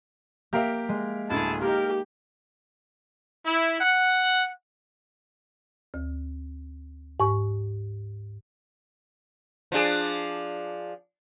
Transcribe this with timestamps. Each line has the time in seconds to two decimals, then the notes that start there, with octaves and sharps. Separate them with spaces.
0.53 A#3 G4 A#4 E5 F5
0.89 G#3
1.30 D1 D3 E4 G#4 A5
1.61 A#3 D#4 G4 A#4
3.46 E4
3.81 F#5
5.94 D2
7.20 G#2 C#6
9.72 F3 D4 G#4